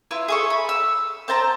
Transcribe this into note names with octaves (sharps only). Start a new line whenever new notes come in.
E4 F4 B4
G#4 A4 C#6
B5
E6
C4 C5 A5 A#5